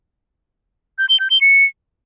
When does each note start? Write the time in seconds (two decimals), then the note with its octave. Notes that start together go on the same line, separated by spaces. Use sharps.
0.98 G6
1.09 G7
1.20 G6
1.30 G7
1.41 C#7